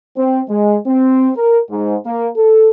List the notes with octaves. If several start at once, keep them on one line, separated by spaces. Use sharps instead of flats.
C4
G#3
C4
A#4
G#2
A#3
A4